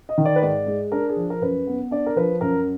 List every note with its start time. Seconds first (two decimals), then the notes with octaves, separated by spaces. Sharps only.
0.09 D#5
0.18 D#3
0.25 D5
0.36 B4
0.42 G#2 D5
0.67 G#3
0.92 D4 A#4
1.09 G#4
1.16 F3
1.30 A#4
1.41 F#2 B4
1.67 B3
1.91 D4 D5
2.06 A#4
2.16 F3 B4
2.41 F#2 A#4